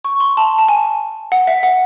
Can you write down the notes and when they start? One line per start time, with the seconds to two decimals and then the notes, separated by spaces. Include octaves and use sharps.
0.05 C#6
0.20 C6
0.37 A5
0.59 A5
0.68 G#5
1.32 F#5
1.47 E5
1.63 F#5